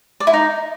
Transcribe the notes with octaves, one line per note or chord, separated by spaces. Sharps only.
D5
E4
D#4